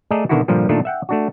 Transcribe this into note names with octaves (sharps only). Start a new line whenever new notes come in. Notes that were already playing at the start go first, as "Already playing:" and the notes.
A3 G#4 A4 D5 D#5 A#5
B2 D3 D#3 D#4 E4 F#4
G2 A#2 D3 F3 G3
A#2 D#3 A3 D4 F4 A4
E5 F#5 G5
A3 D4 F#4